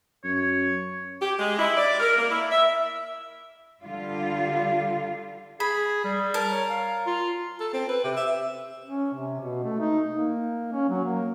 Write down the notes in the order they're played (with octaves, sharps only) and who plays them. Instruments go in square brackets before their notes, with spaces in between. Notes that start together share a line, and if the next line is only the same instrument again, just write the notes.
[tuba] F#2 [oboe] C#5
[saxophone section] G4
G#3
E4
D5
A#4
A#3
E4
E5
[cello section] D3 G3 F4
[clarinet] G#4 [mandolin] B5
[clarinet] G3
[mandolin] A#4 A5
[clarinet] C#5
F5
F4
[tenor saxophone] A4
C4
B4
C3
E5
[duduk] C#4
C3
B2
A3
D#4
A#3
C#4
F#3
A#3